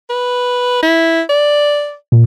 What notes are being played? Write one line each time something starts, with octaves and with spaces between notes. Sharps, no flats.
B4
E4
D5
A#2